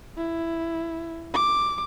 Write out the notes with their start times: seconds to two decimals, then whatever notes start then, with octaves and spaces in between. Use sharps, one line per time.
0.18 E4
1.34 D6